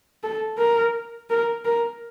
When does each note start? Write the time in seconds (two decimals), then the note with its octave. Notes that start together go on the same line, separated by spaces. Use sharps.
0.24 A4
0.58 A#4
1.30 A#4
1.65 A#4